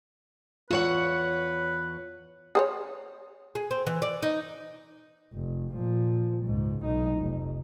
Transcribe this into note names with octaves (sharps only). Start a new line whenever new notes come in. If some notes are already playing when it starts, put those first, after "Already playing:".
E2 F4 B4 C#5 F#5
G#4 C5 C#5
G#4
C4
E3
D5
D#4
F1
A#2 F3
C#2 G#2
B1 D#4
F1